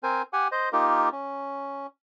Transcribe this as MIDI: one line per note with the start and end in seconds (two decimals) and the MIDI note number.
0.03 0.22 60
0.03 0.22 70
0.03 0.22 72
0.03 0.22 80
0.33 0.48 67
0.33 0.48 78
0.33 0.48 80
0.52 0.69 72
0.52 0.69 75
0.73 1.09 58
0.73 1.09 63
0.73 1.09 65
0.73 1.09 67
0.73 1.09 70
1.12 1.87 61